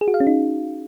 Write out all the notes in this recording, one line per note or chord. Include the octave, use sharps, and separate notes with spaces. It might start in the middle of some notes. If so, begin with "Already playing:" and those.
G#4
F#4
F5
C#4
D#4